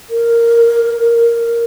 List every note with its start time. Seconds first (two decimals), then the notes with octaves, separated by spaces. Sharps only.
0.10 A#4
1.00 A#4